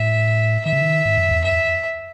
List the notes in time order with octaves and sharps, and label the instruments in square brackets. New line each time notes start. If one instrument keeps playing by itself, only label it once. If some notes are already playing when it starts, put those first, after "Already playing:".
Already playing: [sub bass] A2 [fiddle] E5
[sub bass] D#3 [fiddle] E5
[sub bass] C#3
D#3
G#2
F#2
E2
[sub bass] F#2 [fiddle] E5